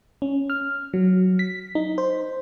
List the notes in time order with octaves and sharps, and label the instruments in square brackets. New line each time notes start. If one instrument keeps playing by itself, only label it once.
[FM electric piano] C#4
F6
F#3
B6
D#4
C5